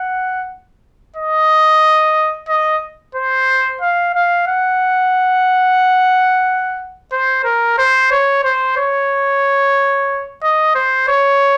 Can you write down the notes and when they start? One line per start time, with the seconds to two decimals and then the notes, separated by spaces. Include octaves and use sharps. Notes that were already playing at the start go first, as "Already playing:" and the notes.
Already playing: F#5
1.16 D#5
2.49 D#5
3.15 C5
3.81 F5
4.14 F5
4.47 F#5
7.12 C5
7.44 A#4
7.78 C5
8.11 C#5
8.44 C5
8.77 C#5
10.43 D#5
10.75 C5
11.08 C#5